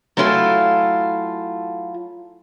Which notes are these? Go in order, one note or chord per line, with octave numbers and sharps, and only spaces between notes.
F#3 A3 E4 F4 A4 G#5